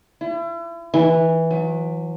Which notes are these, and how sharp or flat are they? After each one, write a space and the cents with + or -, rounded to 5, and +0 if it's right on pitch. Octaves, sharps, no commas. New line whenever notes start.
E4 +40
E3 -10
F#3 -35